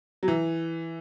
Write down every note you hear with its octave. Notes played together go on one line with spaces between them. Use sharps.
F#3
E3